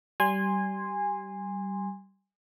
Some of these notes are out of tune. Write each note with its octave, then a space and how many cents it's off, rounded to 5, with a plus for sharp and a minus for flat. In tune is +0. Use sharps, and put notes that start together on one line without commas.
G3 -20 G#5 -20 C6 +0